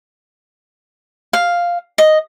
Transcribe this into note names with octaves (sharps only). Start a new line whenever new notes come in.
F5
D#5